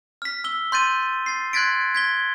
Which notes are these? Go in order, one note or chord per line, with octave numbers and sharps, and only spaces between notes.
F6 B6
E6 G7
C6 G6 A6 D#7
A6 C7
C6 F#6 G#6 A6 B6 D7
G#6 B6 G7